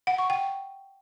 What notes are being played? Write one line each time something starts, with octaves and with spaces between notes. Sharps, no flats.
F#5
C#6
G5